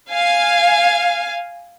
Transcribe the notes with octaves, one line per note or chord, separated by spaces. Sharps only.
F5 G#5